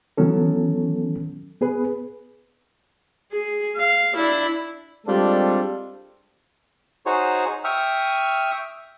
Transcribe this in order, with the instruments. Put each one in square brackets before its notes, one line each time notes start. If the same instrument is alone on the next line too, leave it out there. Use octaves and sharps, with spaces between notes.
[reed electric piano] D#3 E3 F#3 B3 C#4 A4
B3 G#4 B4
[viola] G#4
F5
D4 E4
[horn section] G3 G#3 C4 D4 F4 A4
[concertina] D#4 F#4 G#4 C5 C#5
E5 G5 C#6 D#6 F6